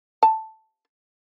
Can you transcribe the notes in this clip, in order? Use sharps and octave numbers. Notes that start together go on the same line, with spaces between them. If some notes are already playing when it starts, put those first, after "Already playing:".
A5